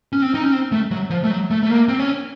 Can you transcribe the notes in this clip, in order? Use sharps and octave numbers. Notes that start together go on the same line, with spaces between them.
C#4
C4
D#4
C#4
C4
A3
F#3
F3
A3
F#3
A3
A3
A#3
C4
C#4